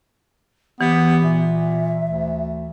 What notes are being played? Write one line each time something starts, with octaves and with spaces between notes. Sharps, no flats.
E3 B3 G4
A#2 E5
D2